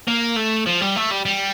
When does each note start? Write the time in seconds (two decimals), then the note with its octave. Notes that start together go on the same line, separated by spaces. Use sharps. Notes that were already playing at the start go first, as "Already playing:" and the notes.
0.08 A#3
0.37 A3
0.67 F3
0.82 G3
0.97 A3
1.11 G3
1.26 G3